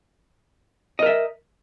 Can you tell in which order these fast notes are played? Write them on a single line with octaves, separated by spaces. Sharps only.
D#5 A#4 E5